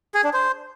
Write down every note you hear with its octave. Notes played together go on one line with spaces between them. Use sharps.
G#4
D4
C5